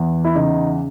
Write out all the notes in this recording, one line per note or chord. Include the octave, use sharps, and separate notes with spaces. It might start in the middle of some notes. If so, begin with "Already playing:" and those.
Already playing: E2
E4
C#3 D#4